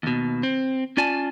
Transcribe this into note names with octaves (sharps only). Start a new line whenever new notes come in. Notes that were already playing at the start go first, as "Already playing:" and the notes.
D#2 B2
C4
C#4 F4 D5 G#5 A5